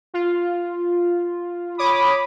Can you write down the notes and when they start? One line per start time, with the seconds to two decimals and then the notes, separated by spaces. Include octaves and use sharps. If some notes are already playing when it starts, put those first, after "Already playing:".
0.14 F4
1.78 C#5 B5 D6 D#6